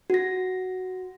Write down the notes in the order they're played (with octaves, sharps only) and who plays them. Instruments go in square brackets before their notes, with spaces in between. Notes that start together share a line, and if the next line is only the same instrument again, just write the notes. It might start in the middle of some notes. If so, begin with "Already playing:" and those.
[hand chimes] F#4 A#6